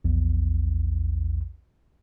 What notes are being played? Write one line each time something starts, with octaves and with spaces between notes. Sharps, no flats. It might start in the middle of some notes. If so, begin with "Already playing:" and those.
A#1 E2